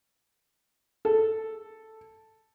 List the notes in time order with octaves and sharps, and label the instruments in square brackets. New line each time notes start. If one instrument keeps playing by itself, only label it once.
[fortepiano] A4